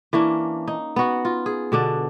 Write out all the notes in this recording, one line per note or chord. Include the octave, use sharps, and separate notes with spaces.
E3 A#3 C#4 D4
D#4
B3 F#4
F4
G#4
B2 D3 D4